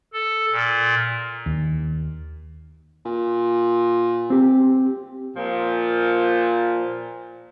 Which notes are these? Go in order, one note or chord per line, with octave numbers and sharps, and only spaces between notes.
A4
A#2
D#2
A#2
C4 G4
A#2 F3